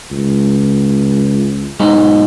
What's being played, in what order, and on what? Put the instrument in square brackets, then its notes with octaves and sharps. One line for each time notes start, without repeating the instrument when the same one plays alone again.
[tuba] C#2
[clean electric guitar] B1 G#2 D#4